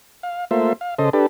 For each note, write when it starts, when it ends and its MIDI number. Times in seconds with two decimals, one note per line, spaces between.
0.23 0.45 77
0.51 0.73 57
0.51 0.73 58
0.51 0.73 65
0.51 0.73 72
0.51 0.73 76
0.81 0.95 77
0.99 1.10 49
0.99 1.10 69
0.99 1.10 72
0.99 1.10 75
1.13 1.26 62
1.13 1.26 67
1.13 1.26 69
1.13 1.26 71